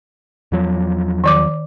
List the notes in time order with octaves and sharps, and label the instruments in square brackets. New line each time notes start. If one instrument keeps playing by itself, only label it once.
[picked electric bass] E2 F3 F#3
[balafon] D#3 D5 D6